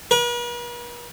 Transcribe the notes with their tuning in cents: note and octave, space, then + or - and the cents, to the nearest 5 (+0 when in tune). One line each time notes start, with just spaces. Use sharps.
B4 -45